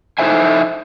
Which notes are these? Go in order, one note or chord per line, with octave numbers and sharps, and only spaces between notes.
D#4 E4 A4 C5 E5 G#5